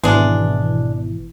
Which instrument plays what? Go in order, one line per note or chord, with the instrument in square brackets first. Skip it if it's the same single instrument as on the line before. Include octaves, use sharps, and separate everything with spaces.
[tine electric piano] G#1 [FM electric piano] B2 E3 [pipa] G#3 D4